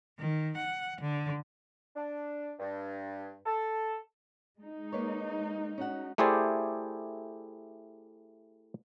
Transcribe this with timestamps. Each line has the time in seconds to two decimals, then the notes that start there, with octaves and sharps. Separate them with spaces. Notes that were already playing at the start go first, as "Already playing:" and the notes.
0.19 D#3
0.58 F#5
1.01 D3
1.96 D4
2.60 G2
3.46 A4
4.58 G#3 D#4
4.92 A#3 B4 C#5
5.78 C#4 F#4 F#5
6.18 A3 E4 G4 G#4 C5 D5